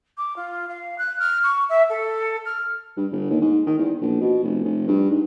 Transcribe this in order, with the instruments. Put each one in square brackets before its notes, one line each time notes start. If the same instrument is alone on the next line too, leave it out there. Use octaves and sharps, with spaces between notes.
[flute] D6
F4
F5
F#6
F6
C#6
E5
A4
F6
[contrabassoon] G2
G1
D#2
G#2
D#3
E2
A#1
B2
F1
F1
G2
G#2